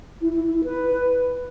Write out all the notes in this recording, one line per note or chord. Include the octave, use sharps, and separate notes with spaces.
E4
E4
E4
E4
B4